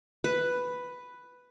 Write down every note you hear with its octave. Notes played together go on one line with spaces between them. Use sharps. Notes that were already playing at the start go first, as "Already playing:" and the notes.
B4